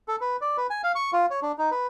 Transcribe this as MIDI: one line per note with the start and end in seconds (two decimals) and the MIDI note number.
0.08 0.16 69
0.21 0.37 71
0.41 0.57 74
0.57 0.67 71
0.70 0.82 80
0.84 0.92 77
0.95 1.11 85
1.13 1.26 65
1.30 1.40 73
1.42 1.52 62
1.58 1.70 63
1.71 1.87 71